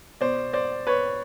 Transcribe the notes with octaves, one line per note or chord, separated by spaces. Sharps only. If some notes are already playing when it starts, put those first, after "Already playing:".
B2 C5 D5
C5 D5
B4 C#5